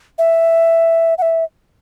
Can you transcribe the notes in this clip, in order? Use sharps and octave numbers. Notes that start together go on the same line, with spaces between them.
E5
F#5
E5